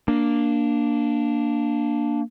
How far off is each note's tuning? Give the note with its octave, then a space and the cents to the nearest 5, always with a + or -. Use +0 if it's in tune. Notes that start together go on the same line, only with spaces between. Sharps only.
A#3 +0 D4 +0